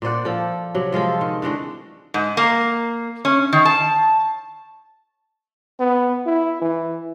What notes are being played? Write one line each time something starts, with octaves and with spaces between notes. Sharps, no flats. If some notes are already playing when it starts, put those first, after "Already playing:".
A#2 C5 D5 F#5
F3 A4
C3 F#3
F3 G#3 F4 A4
D#3
D3 E3 G#3 A3
G#2
A#3
C#4
D#3
A5
B3
E4
E3